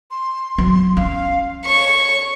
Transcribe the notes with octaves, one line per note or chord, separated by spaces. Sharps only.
C6
F#3
C#4 F5
C#5 C#6